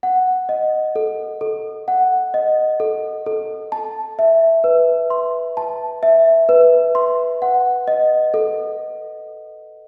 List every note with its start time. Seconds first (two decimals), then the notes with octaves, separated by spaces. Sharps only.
0.03 F#5
0.49 D#5
0.96 A4
1.41 A4
1.88 F#5
2.34 D#5
2.80 A4
3.26 A4
3.72 A5
4.19 E5
4.64 B4
5.10 C6
5.57 A5
6.03 E5
6.49 B4
6.95 C6
7.42 F#5
7.88 D#5
8.34 A4